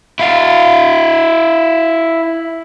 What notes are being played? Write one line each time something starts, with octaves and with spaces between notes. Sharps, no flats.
E4 F5